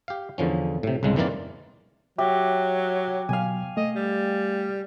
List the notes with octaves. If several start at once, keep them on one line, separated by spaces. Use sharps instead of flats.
G4 F5
E2 D3 F3 C#4
A2 C3
C2 G#2 C#3 G#3
F2 D#3 E3 A#3 F4 D5
F#3 G4 E5
B2 F#3 F5 G#5
A3 D#5
G3